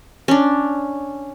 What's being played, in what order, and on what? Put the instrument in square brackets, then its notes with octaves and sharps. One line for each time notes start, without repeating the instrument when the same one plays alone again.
[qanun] C#4 D4